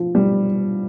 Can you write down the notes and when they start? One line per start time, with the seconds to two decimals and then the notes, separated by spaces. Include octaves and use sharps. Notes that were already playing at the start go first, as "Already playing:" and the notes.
Already playing: F3
0.15 G3